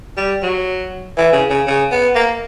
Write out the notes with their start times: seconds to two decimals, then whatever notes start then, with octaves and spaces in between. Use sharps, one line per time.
0.17 G3
0.42 F#3
1.17 E3
1.33 C#3
1.50 C#3
1.67 C#3
1.91 B3
2.15 A#3